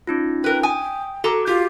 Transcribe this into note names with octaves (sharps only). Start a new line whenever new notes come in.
C#4 D#4 F4
A#4 B4 G5
G#5 D#6
F#4 A4 A#5 D6
F4 G4